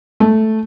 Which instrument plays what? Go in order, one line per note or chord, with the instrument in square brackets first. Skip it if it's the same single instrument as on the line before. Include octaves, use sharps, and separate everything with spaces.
[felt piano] A3